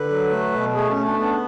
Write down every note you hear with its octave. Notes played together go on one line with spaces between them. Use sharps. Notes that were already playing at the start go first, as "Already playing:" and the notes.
Already playing: D3 B4
F#3
A3
B2
A3 G#4
C#4
A3
D4
B3 D4